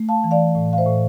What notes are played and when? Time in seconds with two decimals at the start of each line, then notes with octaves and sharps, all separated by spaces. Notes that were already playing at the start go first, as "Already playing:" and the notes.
Already playing: A3
0.09 F5 A5
0.24 E3
0.31 D5 F5
0.55 A2
0.73 F5
0.78 C5 E5
0.86 A2